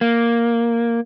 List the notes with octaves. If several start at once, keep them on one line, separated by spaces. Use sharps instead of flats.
A#3